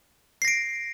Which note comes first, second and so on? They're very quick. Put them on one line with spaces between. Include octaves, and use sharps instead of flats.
C7 A#6 D7